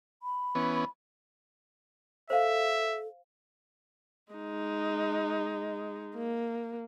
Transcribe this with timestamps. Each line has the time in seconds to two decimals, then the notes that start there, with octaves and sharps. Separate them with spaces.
0.23 B5
0.55 E3 B3 C#4
2.30 A4 C5 E5 F5
4.32 G#3 D#4
6.15 A#3